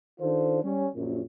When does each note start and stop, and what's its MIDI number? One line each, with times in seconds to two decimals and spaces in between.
0.20 0.62 51
0.20 0.62 62
0.20 0.62 65
0.20 0.62 69
0.20 0.62 72
0.63 0.87 55
0.63 0.87 61
0.95 1.21 34
0.95 1.21 42